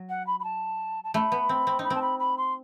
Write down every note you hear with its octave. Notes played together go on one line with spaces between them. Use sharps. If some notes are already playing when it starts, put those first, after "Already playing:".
Already playing: F#3
F#5
B5
B5
A5
A5
A3 B5
B3
C4
C4
D#4
B5
C4 A5
B5
B5
C6